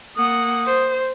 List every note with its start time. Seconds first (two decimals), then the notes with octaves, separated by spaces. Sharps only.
0.17 A#3 F#5 D#6
0.65 C5